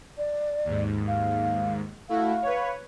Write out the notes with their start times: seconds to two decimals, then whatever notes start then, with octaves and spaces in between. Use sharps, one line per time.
0.18 D5
0.65 D#2 G#2
1.07 F5
2.09 A3 E4 F#4 F5
2.42 B4 C#5